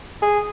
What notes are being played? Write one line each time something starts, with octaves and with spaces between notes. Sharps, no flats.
G#4